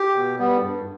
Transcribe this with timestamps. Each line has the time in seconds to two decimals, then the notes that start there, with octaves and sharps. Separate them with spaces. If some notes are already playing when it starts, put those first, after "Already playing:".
Already playing: G4
0.16 B2
0.39 G3 B3
0.62 G2